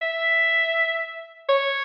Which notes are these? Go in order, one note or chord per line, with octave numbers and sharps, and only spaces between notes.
E5
C#5